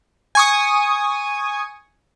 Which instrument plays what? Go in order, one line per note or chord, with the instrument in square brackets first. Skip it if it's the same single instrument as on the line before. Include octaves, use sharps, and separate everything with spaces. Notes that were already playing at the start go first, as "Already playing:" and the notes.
[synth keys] G#5 C#6 D#6